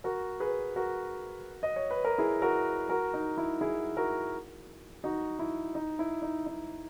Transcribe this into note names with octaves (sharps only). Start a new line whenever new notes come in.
F#4 A#4
G#4 B4
F#4 A#4
D#5
C#5
B4
A#4
E4 G#4
F#4 A#4
F#4 A#4
D#4
E4
E4 G#4
F#4 A#4
D#4 F#4
E4
D#4
E4
D#4
D#4